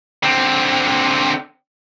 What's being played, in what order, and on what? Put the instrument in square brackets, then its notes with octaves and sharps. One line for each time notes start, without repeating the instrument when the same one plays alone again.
[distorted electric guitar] D3 C4